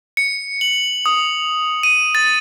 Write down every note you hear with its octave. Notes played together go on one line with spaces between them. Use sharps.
C#7
F#7
D#6
D#7
A6